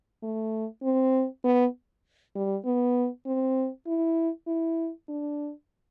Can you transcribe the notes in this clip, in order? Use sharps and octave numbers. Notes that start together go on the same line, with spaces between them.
A3
C4
B3
G3
B3
C4
E4
E4
D4